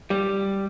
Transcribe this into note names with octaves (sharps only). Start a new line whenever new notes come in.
G3